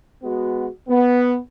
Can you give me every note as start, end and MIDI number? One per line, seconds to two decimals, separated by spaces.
0.23 0.67 56
0.23 0.67 59
0.23 0.67 66
0.88 1.37 59